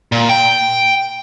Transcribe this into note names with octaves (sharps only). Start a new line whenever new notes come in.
A#2
G5